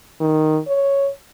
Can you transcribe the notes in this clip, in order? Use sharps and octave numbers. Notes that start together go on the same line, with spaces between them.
D#3
C#5